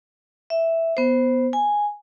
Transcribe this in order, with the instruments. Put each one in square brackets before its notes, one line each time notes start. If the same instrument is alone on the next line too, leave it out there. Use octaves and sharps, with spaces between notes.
[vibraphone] E5
B3 C5
G#5